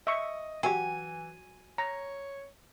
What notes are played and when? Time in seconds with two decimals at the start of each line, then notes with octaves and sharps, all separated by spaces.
0.07 D#5 E5 C#6
0.63 E3 F#3 F#4 G4 G#5
1.78 C#5 A#5